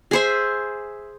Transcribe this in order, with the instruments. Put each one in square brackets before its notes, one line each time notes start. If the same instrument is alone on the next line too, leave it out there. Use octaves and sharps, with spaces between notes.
[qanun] G#4 C5 E5